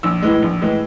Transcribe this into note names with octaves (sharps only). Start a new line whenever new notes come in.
A#1 E6
A2 E3 G#3
A#1
A2 E3 G#3